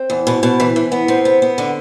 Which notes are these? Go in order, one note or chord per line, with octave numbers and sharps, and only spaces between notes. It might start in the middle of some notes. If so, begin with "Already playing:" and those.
Already playing: C4
E2
B2
B2
E3
E3
B3
C3 C4
B3
B3
D3